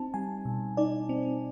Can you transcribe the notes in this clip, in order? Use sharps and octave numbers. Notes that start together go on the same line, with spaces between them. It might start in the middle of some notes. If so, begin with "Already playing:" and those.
Already playing: C4 D#4 A5
G3 G#5
B2
D#4 D5
C4